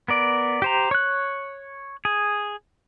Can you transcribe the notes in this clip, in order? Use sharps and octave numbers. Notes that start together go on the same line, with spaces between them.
B3 A#4 D5
G4 C5 A#5
C#5 F#6
G#4